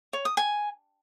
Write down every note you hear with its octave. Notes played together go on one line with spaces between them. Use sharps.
C#5
D#6
G#5